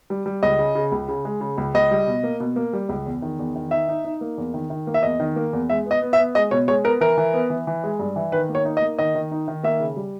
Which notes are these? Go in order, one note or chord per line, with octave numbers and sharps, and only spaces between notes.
G3
G3
C#2 D#5
C#3
C#3
C#2
C#3
G#3
C#3
C#2
C#2 D#5
G3
B2
A#3
B2
A#3
G3
C#2
E2
D#3
E2
D#3
D#4 E5
D#4
D#4
A#3
E2
D#3
D#3
A#3
E5
E2 D#5
D#3
A#3
E2
G#3 E5
B3
D#5
B3
E5
B3
G#3 D#5
B2 C#5
G#3 C#5
B3 A#4
E3 A#4
E3
B3
E3
E3
G#3
G2
E3
D#3 B4
A#3
C#5
D#4
D#5
A#3
D#3 D#5
D#3
D#4
D#3
A#3 E5
C#3
G3